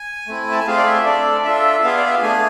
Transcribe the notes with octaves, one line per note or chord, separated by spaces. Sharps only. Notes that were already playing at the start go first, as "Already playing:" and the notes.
Already playing: G#5
A3 C4 E4
A5
G#5
A3 C4 F4 G#4 F5
D5
E5
D4 A4 D5
D4 F4 A4 E5
B3 F4 G#4 F5
D5
E5
F5
A3 D4 G#4 G#5